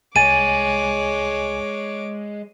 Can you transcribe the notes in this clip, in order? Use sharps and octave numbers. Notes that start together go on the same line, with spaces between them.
C2 G#3 C#5 G#5 D6 A6 D#7